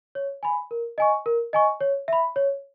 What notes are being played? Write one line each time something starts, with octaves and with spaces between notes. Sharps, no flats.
C#5
G#5 B5
A#4
D#5 G#5 C#6
A#4
D#5 G#5 C#6
C#5
E5 B5
C#5